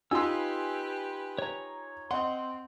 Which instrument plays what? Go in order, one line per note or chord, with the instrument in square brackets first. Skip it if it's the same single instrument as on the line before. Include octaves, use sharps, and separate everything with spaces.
[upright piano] D#4 F4 [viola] G4 B4 [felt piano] G#5 C6 [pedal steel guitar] E6
[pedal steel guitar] C#5 A#5
[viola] C4 [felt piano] D#5 F#5 [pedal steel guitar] C6